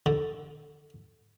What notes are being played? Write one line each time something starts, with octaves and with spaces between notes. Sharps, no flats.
D3